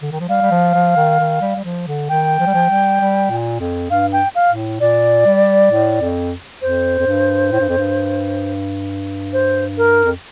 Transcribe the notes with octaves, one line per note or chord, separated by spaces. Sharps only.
D3
D#3
F3
G3 F5
G3
F3
F3
D#3
D#3
G3
G3
F3
D3
D#3 G5
F3
G3
F3
G3
G3
A#2
F2
G2 F5
G5
F5
A2
A#2 D5
G3
A2
F2
F2 C5
F2
G2
A2
G2
F2
G2
C5
A#4
F2